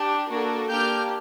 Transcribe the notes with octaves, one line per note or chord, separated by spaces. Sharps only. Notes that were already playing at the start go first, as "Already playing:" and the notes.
Already playing: D4 G4
A#3 D4 F#4 A4
A#3 D4 G4 F6 G6